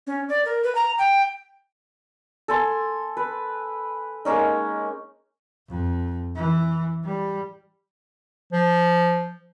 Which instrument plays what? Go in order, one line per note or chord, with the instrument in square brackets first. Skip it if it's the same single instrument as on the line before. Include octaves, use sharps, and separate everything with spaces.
[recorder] C#4
D5
A#4
B4
A#5
G5
[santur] A4 G#5 C6
B4
G#3 A#3 C#4 D#4
[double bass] F2
E3
G3
[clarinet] F3